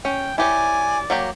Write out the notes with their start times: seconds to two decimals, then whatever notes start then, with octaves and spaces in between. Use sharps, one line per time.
0.05 C#4 G5
0.38 E4 G4 C#5 D5 G#5
1.10 F#3 A#3 G4